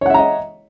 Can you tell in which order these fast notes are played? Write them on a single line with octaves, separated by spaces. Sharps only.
C#5 F#5 E5 A#5 D#5